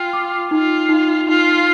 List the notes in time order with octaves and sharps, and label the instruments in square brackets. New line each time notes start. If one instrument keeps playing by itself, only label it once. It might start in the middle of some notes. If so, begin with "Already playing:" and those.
Already playing: [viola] F4 [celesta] G5
[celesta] D6
[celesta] D#4 [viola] F4
[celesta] D#4
[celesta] D#4 [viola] F4